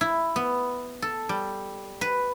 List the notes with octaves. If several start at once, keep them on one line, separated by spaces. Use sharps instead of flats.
E4
B3
A4
G3
B4